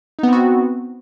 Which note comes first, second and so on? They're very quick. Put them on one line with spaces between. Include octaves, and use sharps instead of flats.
D#4 B3 C4 F#4